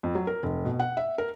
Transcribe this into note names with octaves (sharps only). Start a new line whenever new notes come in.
F2
F#3
A#4
F1
B2
F#5
E5
A#4